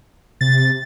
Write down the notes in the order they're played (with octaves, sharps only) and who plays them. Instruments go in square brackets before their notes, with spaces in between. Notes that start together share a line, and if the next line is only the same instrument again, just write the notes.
[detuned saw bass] C3 [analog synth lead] A6